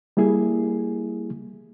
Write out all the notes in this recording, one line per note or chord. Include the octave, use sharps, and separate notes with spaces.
G3 A#3 E4 G#4